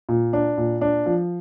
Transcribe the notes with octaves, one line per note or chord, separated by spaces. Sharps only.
A#2
D4
A#2
D4
F3